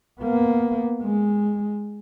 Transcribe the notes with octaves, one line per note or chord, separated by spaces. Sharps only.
A#3 B3
G#3